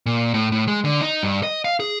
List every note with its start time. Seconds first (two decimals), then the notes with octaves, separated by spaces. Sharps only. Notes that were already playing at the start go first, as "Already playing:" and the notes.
0.06 A#2
0.34 A2
0.52 A2
0.67 G#3
0.85 D3
1.01 D#4
1.23 G2
1.43 D#5
1.65 F5
1.80 G#4